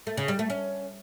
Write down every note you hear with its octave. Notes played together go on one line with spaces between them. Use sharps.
A3
C#3
G3
A3
C#4